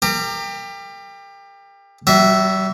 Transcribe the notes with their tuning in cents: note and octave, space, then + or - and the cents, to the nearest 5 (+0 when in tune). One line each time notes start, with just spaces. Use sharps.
G4 +25 A#4 -30
G3 -40 F#4 +0 E5 +0